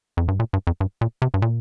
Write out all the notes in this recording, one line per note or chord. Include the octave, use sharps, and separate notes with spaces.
F2
G2
A#2
G2
F2
G2
A#2
C3
G2
A#2